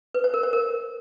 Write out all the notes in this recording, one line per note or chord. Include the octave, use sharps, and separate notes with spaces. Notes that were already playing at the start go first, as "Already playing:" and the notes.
B4
C5
A#4
C5
A#4